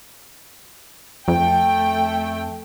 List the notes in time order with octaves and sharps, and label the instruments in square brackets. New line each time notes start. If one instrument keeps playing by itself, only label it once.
[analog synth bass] F2 [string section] A3 G5